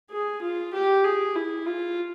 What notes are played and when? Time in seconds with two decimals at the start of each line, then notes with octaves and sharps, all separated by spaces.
0.11 G#4
0.42 F4
0.73 G4
1.04 G#4
1.35 E4
1.66 F4